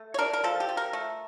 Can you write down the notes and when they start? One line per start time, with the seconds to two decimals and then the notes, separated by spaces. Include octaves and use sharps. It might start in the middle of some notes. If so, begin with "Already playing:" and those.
Already playing: A3
0.14 C#5
0.19 D4 A#4
0.33 A#4
0.44 F3 A4
0.60 G4
0.69 F3
0.77 A#4
0.93 A3